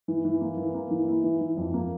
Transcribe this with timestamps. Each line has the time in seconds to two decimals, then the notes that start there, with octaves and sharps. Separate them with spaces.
0.08 E3
0.25 E3
0.41 A#3
0.57 E3
0.74 A#3
0.91 E3
1.08 E4
1.24 E3
1.41 E3
1.57 F2
1.74 A#3